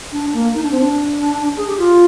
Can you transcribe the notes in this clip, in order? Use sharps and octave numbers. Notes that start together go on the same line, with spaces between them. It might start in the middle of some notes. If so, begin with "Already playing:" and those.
D4
A#3
D#4
D4
C4
D4
G#4
G4
F4